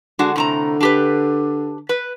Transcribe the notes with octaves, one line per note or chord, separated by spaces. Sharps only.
D3 G#3 D4 F#4
A2 C3 A#5
D4 G4 B4
B4